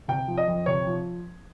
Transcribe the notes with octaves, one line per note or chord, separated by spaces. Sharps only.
C3 G5
F3
D#5
F2
C3 C#5
F3